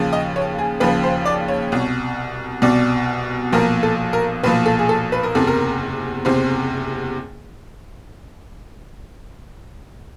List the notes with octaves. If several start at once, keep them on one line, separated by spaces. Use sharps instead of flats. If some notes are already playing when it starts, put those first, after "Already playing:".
Already playing: D#2 C#3 F3
D#5
C#5
G#4
D#2 C#3 F3 B4
C5
D5
C#5
C2 B2
C2 B2 D5
B1 A#2 F3 A#4
A4
A#4
B1 A#2 F3 B4
A4
G#4
A4
B4
A#4
F#1 E2 C3 A4
A#4
F#1 E2 C3 C5